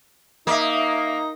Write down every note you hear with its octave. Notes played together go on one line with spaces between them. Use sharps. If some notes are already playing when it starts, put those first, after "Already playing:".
A#3 D#4 E5 D#6